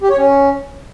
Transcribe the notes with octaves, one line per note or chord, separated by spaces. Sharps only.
G4
C#5
C#4